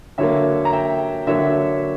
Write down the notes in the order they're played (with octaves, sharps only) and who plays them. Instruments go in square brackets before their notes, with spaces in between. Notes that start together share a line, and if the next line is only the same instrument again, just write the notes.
[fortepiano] D3 F#3 A#3 C#5 E5
A#5
E5 G5
D3 F#3 A#3 C#5 E5